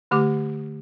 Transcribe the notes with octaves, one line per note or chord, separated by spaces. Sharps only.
D3 A3 G4 D6